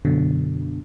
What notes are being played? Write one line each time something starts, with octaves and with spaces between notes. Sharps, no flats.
F#2 B2 D3